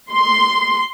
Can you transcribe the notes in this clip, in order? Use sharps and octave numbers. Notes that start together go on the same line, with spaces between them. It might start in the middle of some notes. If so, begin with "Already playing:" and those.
C6